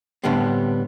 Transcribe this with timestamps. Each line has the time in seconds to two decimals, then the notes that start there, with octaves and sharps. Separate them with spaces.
0.24 A2 D3 G3 B3 C4